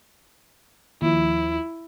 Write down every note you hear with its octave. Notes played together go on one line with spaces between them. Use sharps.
D#2 F3 E4